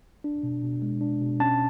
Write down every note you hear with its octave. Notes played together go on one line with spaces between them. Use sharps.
D4
B2
B2
G#3
D4
B2
C#4 A5